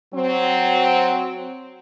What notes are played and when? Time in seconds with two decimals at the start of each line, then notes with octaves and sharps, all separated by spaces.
0.14 F#3 C4